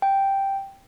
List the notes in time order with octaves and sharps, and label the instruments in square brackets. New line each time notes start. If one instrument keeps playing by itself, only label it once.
[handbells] G5